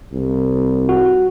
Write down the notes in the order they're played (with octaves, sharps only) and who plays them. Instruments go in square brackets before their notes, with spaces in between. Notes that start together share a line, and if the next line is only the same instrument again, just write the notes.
[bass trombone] C2
[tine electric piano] F#4